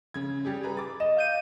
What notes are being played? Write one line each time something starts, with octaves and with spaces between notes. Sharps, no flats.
C#3 G#6
G3 G4 G#4
G#4 B4 A#5
D6 A6
D#5 E7
F5 G6 D#7